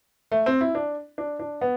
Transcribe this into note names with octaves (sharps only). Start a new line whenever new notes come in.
A3
C4
E4
D4
D4
D4
B3